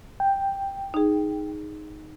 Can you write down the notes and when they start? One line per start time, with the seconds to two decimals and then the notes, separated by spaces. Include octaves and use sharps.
0.20 G5
0.94 D#4 G#4